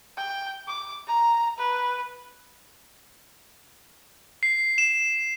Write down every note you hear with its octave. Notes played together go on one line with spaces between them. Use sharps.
G5
D6
A#5
B4
C7
E7